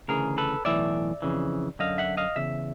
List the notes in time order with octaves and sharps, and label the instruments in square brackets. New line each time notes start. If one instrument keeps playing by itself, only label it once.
[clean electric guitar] D2 C#3 E3 G#4 A#4
A4 B4
B1 A2 E3 D5 E5
F2 C#3 E3
F#2 D3 D#5 F5
E5 F#5
D#5 F5
E2 C#3 E5